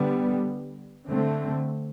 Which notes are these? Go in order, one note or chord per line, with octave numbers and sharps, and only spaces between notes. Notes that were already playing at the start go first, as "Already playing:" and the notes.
Already playing: D3 G3 B3
D3 A3 C4